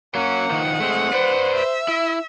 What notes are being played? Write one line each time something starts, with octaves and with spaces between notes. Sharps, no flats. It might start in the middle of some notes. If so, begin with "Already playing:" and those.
F#3 A#3 C#4 F#5
D#3 F3
G#3 A3 C4
B4 C5 D5
E5
E4